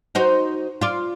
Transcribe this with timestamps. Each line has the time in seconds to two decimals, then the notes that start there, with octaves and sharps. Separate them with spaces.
0.15 D#4 F#4 C5
0.81 F4 D5